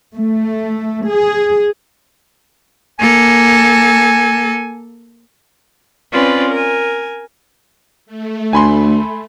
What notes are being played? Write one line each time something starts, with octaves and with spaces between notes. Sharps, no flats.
A3
G#4
A#3 A4 G#5
C4 C#4 F4 B4 D5
A#4 G#5
A3
D2 G#5 B5 C6